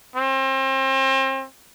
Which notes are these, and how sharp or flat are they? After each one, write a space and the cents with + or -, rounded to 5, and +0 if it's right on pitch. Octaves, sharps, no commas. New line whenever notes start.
C4 +35